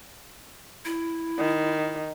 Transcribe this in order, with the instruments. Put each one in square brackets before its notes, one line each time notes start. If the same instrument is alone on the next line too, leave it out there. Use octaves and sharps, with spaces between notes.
[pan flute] E4
[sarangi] D#3